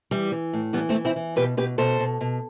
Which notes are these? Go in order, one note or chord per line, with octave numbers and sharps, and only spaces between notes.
E3 G3
E3
A2
E3 G3 B3
A3 C4
E3
C4 E4
E3
B2 G4 B4
B2 G4 B4
B2 A4 C5
B2
B2